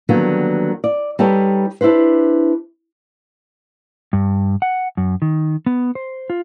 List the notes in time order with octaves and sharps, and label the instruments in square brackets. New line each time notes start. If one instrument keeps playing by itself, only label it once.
[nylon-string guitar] D3 D#3 F#3 G3 A#3 B3
D5
G3 D#4 G4 A4 B4 C#5
D4 E4 G4 B4 C5
[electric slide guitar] G2
F#5
F#2
D#3
B3
C5
F4